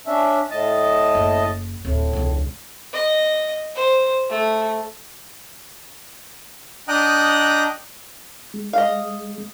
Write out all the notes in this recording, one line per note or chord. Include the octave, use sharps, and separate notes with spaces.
C#4 D4 E5
A2 D#5 A5
F#1
D1 A2
E1 C#2
D#5
C5
A3
D4 D#5 G5 A#5 D#6 F#6
G#3
D#5 F5